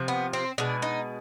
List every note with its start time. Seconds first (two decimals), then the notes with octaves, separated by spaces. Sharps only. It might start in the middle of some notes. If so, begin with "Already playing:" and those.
Already playing: C3 F3
0.08 B3
0.33 C4
0.58 B2 G#3 D4
0.82 D#4